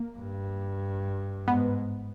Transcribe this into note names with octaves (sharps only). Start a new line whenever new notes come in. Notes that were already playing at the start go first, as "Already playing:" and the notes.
Already playing: A#3
G2
G#2 B3